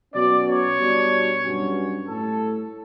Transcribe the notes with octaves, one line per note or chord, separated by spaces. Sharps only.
B2 F#3 C#4 D5
C#5
B2 G3 D4
G2 F#3 C#4
A2 A4